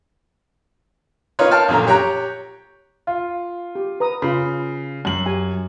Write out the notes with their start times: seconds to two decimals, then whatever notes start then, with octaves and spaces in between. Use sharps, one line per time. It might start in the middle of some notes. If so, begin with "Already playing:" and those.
1.39 C#4 D#4 F4 A#4 B4 C#5
1.51 F5 G5 A5 F6
1.68 A#1 F#2 D3 A#5
1.87 G4 C#5 G5 A#5 F#6
3.07 F4
3.75 G4
4.00 B4 A#5 D#6
4.22 C#3 F4 B5
5.05 F#2 F#7
5.26 G4 G#5